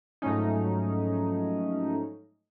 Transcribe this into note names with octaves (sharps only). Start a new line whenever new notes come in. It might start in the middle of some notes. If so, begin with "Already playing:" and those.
G#2 F3 F#3 A3 C#4 D#4